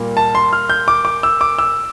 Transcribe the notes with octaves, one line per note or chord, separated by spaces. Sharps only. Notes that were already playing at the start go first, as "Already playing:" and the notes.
Already playing: A#2 G3 A#3
A5
C6
F6
G6
D6
D6
E6
D6
E6